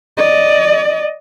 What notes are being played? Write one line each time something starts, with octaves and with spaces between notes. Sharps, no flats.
D5 D#5